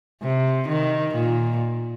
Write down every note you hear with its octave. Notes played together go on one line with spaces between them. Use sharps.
C3
D#3
A#2